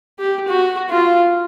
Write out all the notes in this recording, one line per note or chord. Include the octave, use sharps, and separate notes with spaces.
G4
F#4
F4